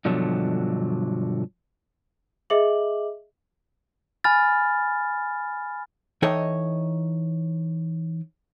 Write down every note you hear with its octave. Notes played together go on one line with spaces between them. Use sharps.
G2 B2 D3 F3 F#3
G#4 D#5 E5 D6 F#7
G#5 B5 F6 A6
E3 D#4 A4 C#5 D#5 G5